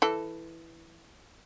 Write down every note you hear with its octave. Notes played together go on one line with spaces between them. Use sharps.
E3 A4